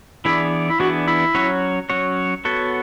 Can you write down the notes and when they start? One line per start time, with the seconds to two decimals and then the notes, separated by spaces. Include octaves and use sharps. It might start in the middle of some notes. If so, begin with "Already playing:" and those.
0.25 E3 B3 D4 E4 G#4 D5
0.69 E4
0.80 E3 B3 D4 F#4 G#4 D5
1.07 E4
1.35 F#3 C#4 F#4 C#5
1.90 F#3 C#4 F#4 C#5
2.45 B3 F#4 A4 C#5